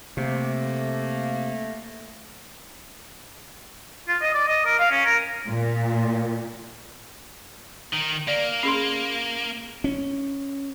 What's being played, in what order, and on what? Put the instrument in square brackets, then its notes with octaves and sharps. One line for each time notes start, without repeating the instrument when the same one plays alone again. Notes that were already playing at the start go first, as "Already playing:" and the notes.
[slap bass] C3 [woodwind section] A3 A#3
[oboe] F4
D#5
D5
D#5
A#4
F5
C#4
A#4
[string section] A#2
[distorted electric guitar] D#3
[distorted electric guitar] A#3 [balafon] D5
[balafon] C#4 G#4 C6
[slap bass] C#4